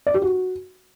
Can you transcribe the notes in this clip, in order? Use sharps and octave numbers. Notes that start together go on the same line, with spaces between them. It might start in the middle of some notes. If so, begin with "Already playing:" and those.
D5
G4
F#4